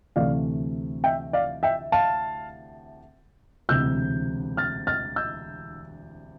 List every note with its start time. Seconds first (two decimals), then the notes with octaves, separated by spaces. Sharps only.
0.16 D2 C3 E3 A3 D5 F5
1.04 E5 G5
1.33 D5 F5
1.63 E5 G5
1.92 F5 A5
3.69 E1 D2 C3 E3 E6 G6
4.57 F6 A6
4.87 F6 A6
5.16 E6 G6